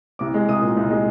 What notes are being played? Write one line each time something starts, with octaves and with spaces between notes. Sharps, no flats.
C2 D6
G#3
C2 D#6
A#2
C2
G#3